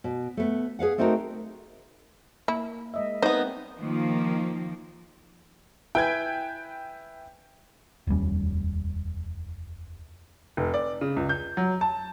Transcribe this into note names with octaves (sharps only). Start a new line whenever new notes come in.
B2
A3 B3
G#4 B4 F5 F#5
A3 C4 D#4 F#4 A#4
A#3 E4
G#3 D#5 E5
B3 C4 D#4 A#4 C5
D#3 F3 A#3
E4 B4 G5 G#5 G6 G#6
F1 D#2 G3 C#4
F1
D5
C#3
C#2
G6
F#3
A5